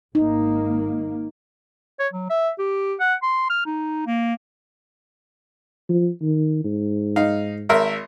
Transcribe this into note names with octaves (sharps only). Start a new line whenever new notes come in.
G#1 A#3 D#4
C#5
F#3
E5
G4
F#5
C6
F6
D#4
A#3
F3
D#3
G#2
D#4 F5
G#1 A#4 E5